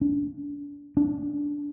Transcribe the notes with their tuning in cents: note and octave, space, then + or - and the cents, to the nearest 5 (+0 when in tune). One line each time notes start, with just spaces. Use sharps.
D4 -30
D4 -10